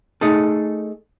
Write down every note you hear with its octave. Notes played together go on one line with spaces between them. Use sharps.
A3 D#4 G#4 A4